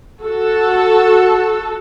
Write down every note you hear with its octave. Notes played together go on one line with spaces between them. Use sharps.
F#4 A4